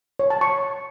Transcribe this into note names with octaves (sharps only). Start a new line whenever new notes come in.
C#5
A5
C#6